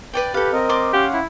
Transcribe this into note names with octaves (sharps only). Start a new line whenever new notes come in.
B4 D5 G5
G4 A4 B4 F5
C4 A#4 D#5
D5 C6 D6
C#4 G4 F5 F#5
E4